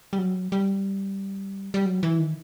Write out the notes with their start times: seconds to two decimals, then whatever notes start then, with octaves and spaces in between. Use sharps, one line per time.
0.13 G3
0.18 F#3
0.52 G3
1.74 G3
1.86 F#3
2.03 E3
2.19 D#3